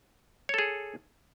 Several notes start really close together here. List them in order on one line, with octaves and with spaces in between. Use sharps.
C#5 A4 G#4